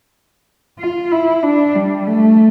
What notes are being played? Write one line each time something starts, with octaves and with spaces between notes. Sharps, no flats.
F4
E4
D4
G3
A3